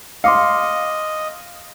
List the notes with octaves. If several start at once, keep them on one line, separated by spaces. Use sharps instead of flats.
D#5 F5 C6 D6 C#7